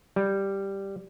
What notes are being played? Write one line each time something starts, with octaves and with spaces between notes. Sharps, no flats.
G3